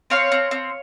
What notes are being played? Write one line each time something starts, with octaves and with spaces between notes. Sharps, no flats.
C4 C#5 F5
C4
C4